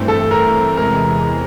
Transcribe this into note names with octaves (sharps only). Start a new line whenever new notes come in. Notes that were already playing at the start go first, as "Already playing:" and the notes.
Already playing: G2 E3 A3 C4
A4
A#4
E2 C3 E3 G#3 A#4